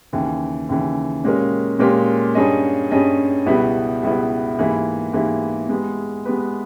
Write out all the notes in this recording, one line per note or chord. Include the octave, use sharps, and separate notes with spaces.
D#2 C#3 E3
D#2 C#3 E3
A#2 G#3 C#4 G4 A#4
A#2 G#3 C#4 G4 A#4
G2 G3 C#4 G#4 D#5
G2 G3 C#4 G#4 D#5
C#2 B2 G3 B3 E4
C#2 B2 G3 B3 E4
G#2 E3 A#3 E4 G4
G#2 E3 A#3 E4 G4
G#3 B3 G4 B4
G#3 B3 G4 B4